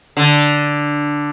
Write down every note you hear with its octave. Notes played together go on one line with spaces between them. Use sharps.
D3